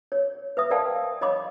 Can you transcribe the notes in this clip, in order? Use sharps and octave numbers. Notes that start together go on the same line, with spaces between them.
C#5
B4 E5 D#6
A#4 C5 D5 F5 G5 A5
C#5 D#5 F5 B5 C6 D6